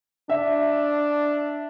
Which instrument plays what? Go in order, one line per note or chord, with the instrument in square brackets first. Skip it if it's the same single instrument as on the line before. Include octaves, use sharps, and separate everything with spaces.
[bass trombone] D4 [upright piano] E5